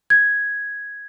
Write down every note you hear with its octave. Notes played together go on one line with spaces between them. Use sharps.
G#6